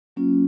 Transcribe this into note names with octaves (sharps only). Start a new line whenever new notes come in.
F#3 A#3 C#4 F4